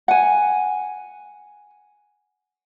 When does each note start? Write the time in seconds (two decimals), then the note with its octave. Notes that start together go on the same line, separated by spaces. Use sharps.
0.08 F#5 G#5